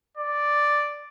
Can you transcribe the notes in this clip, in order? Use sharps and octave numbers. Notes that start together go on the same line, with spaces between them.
D5